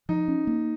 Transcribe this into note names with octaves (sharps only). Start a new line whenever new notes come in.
F3 D#4
C#4
A#3